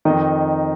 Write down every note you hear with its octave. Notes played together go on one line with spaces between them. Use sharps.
F2 D#3 D#4 D#5